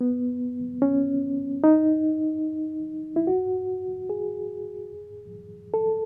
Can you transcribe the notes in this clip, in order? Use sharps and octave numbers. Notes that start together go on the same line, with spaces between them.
B3
C#4
D#4
E4
F#4
G#4
A4